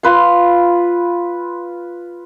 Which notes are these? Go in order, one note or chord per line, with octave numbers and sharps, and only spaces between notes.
F4 B4 C6